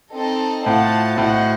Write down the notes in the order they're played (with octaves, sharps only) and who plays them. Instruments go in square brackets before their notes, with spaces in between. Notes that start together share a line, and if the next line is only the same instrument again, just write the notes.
[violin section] C4 D#4 A4 D#5 A5
[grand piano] A2 [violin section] F4 C5 F#5 A5
[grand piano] A2 [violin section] F#4 C5 D#5 F#5